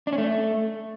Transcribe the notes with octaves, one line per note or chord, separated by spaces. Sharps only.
D4
C#4
A3